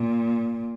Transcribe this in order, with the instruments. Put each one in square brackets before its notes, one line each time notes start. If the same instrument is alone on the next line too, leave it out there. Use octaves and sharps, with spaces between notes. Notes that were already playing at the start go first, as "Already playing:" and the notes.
Already playing: [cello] A#2